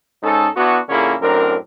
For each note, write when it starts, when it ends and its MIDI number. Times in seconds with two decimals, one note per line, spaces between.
0.23 0.47 44
0.23 0.47 61
0.23 0.47 63
0.23 0.47 69
0.56 0.78 59
0.56 0.78 62
0.56 0.78 64
0.56 0.78 66
0.88 1.14 46
0.88 1.14 50
0.88 1.14 58
0.88 1.14 61
0.88 1.14 64
0.88 1.14 68
1.21 1.55 42
1.21 1.55 45
1.21 1.55 60
1.21 1.55 62
1.21 1.55 70